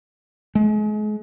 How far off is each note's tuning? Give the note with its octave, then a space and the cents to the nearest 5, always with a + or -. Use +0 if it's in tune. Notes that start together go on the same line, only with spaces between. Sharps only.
G#3 +35